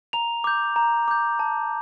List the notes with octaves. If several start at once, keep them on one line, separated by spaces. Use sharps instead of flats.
A#5 F7
D6 G6
A#5
D6 G6
A5